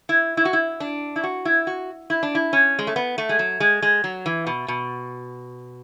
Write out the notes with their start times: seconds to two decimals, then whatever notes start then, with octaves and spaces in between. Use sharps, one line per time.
0.09 E4
0.37 E4
0.45 F#4
0.53 E4
0.80 D4
1.16 E4
1.24 F#4
1.45 E4
1.67 F#4
2.10 E4
2.23 D4
2.35 E4
2.53 C#4
2.79 G#3
2.87 A3
2.96 B3
3.18 A3
3.29 G#3
3.39 F#3
3.60 G#3
3.82 G#3
4.04 F#3
4.26 E3
4.47 B2
4.68 B2